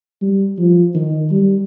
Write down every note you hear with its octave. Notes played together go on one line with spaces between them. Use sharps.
G3
F3
D#3
G3